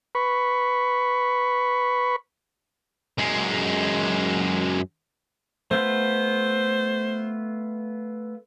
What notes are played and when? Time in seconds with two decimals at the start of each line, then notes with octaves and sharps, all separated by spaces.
0.15 B4 B5 C#6
3.19 F#2 G#3
5.71 A3 B3 F4 C5